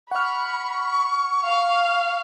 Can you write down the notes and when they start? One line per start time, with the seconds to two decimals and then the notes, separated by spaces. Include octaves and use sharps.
0.11 F#5 B5 C#6 F6
1.44 F5